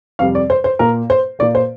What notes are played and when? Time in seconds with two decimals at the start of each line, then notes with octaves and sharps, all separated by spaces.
0.19 F2 C3 G3 F5
0.35 D5
0.50 C5
0.64 C5
0.79 A#2 A#3 A#4
1.10 C5
1.39 A#2 A#3 D5
1.55 C5